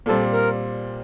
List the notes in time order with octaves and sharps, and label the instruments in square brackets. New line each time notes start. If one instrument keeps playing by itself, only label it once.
[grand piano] A#2 G3 C4 [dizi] A4
[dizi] A#4